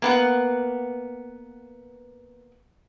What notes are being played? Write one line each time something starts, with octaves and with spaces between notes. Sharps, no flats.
A#3 B3 F#5